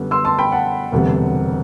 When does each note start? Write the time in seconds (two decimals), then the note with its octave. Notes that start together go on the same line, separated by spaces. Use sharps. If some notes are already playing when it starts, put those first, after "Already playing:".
Already playing: F#2 D3 G3 B3
0.11 C6 E6
0.25 A5 C6
0.39 G5 B5
0.51 F#5 A5
0.91 E1 D2 C3 G3 B3